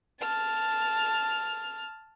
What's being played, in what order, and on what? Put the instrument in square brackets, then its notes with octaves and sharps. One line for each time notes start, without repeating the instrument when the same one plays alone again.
[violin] A5 F6